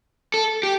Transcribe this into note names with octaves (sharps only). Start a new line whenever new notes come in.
A4
G4